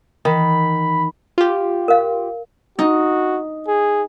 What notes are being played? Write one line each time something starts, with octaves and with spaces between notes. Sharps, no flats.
D#3 E3 B5
F4 G4
A#4 F5
D#4 F#4
G#4